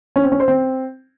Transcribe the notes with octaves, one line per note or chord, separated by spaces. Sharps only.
C#4
C4
C#4
C5
C4